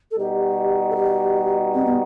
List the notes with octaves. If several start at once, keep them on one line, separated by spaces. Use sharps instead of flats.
A4
B2 G3 D#4 F#4 G4
A4
G4
C4
B3